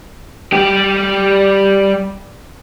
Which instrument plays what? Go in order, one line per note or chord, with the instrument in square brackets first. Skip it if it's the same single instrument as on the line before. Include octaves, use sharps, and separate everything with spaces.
[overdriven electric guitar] G3 G4